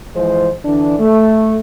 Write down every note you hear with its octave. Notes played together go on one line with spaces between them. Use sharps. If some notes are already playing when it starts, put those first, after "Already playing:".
E3 F3 G#3 C5
D3 E3 D4
A3